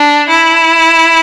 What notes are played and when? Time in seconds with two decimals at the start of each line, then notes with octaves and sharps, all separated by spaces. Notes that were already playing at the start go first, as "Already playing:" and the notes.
Already playing: D4
0.30 E4